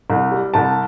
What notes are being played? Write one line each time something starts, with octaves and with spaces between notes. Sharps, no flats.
C2
G3
C2 A5